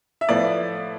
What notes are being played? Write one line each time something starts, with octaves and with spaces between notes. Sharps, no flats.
E5
A2 F3 B3 E4 D5